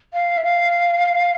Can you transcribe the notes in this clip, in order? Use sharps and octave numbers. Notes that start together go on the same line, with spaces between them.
F5
E5
F5